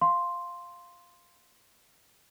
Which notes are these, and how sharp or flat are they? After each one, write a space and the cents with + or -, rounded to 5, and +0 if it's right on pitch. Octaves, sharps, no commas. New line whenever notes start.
F5 +0 C6 +0